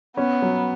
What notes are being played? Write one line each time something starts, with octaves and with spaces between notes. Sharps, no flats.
B3 C#4
F#3